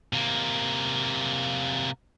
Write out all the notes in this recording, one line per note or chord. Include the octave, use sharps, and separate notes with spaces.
C3 A#3